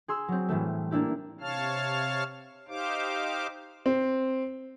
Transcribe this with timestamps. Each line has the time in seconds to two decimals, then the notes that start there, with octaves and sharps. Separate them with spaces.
0.08 G#4 C6 E6
0.28 F#3 C4
0.49 A2 E3 G3 A3
0.91 A#3 D4 E4 G4
1.40 C3 C#5 F5 A5 F6
2.68 D#4 G4 C5 F5 D6
3.86 C4